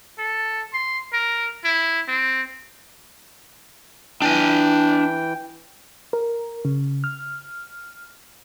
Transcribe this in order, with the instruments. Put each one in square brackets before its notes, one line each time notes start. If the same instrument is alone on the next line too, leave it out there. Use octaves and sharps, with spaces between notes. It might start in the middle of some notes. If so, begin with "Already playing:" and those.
[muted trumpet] A4
C6
A#4
E4
C4
[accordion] E3 G5 [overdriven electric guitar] D4 G#5
[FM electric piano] A#4
C#3
F6